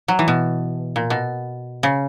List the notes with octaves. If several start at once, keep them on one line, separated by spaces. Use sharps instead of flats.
F#3
E3
B2
A#2
B2
C#3